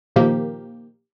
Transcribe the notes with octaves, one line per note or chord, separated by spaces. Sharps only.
A#2 D#3 F3 A#3 G4